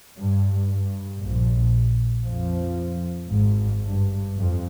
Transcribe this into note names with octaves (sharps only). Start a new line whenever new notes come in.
G2
G2
A#1 A#2
F2 F3
G#1 G#2
G2
F2